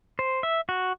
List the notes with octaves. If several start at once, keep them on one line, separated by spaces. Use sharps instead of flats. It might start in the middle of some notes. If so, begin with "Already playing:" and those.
C5
E5
F#4